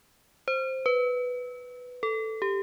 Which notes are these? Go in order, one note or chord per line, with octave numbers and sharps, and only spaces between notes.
C5
B4
A4
G4